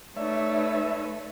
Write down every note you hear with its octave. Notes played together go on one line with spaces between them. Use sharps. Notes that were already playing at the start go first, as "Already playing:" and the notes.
A3 D#4 B4 C#5 D5 E5